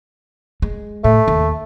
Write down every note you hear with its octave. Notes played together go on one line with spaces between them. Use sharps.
G#3
A2 A3
D#2